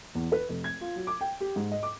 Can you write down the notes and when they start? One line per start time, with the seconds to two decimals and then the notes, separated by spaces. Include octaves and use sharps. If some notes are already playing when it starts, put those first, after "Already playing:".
0.15 E2
0.32 B4
0.49 F1
0.64 G#6
0.81 F4
0.96 F#3
1.07 D6
1.21 G5
1.41 G4
1.56 G#2
1.71 D#5
1.83 D6